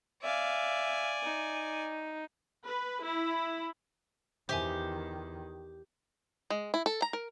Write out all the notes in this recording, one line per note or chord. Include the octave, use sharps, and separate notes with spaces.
D5 E5 F5 G#5
D#4
B4
E4
E2 D#3 G4 C5 E5 G#5
G#3
E4
A4
A#5
A#4